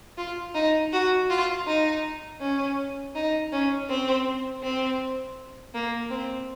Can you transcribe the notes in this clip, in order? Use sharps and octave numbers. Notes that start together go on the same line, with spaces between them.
F4
D#4
F#4
F4
D#4
C#4
D#4
C#4
C4
C4
A#3
C4